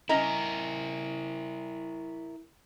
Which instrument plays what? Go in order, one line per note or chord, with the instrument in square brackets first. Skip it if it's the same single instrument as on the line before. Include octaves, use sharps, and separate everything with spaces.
[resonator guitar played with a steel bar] C#4 D#5 A#5 [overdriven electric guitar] E4 A#4